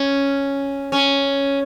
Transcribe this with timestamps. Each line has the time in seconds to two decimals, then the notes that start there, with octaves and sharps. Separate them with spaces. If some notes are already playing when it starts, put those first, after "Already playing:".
Already playing: C#4
0.92 C#4